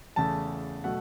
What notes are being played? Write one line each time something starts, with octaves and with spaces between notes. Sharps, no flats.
E2 C#3 A3 A5
B2 F#3 A3 F#5